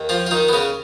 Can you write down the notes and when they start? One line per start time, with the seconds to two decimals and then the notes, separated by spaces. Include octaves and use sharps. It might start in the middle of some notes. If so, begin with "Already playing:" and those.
Already playing: D#2 D#3
0.09 F3 F4
0.27 F4
0.31 D#3 D#4
0.48 B3
0.53 C#3 C#4